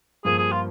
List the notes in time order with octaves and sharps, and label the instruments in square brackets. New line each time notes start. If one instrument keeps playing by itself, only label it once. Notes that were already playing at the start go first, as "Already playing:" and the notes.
[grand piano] G2 F3 A#3 [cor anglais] G#4
[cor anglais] G#4
F4